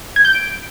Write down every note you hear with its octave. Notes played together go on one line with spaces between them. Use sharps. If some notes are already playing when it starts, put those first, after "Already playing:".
G#6
G6
D7